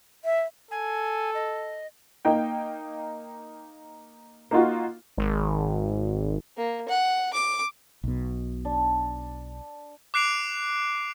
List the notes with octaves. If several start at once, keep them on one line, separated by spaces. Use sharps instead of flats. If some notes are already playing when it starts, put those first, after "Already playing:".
E5
A4 G#5
D#5
A#3 D#4 G5
A#3 D#4 F4 F#4
G#1
A#3
F#5
D6
B1 B2
D4
D6 F#6 C7 D7 F7